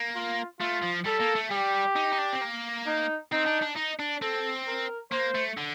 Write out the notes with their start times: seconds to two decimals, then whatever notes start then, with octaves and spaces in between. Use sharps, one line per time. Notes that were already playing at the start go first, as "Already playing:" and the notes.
Already playing: A#3
0.15 F4
0.60 A3 F4
0.83 F3
1.06 G3 A4
1.21 A#3
1.36 A3
1.51 G3 G4
1.96 D#4
2.13 D#4
2.19 D4
2.33 C4
2.42 A#3
2.87 D#4
3.32 C4 D#4
3.47 D4
3.62 D4
3.77 D#4
4.00 D4
4.22 C4 A4
4.67 A#4
5.12 A#3 C5
5.35 A3
5.58 D3